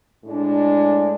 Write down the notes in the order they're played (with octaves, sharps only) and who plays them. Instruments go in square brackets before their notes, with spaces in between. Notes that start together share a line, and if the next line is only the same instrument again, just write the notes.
[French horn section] A2 G#3 D4